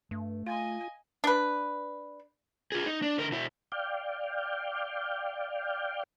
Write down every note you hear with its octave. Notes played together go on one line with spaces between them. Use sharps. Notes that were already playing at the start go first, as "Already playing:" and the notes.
G2 A3
F4 D#5 F5 G#5
D4 B4
F4 G#4
D#4
D4
D3 A#4
B2 E4
D5 F5 G5